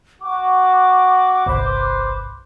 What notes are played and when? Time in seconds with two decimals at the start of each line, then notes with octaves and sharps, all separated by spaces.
0.22 F#4 D6
1.46 G1 C2 B4 C5 B5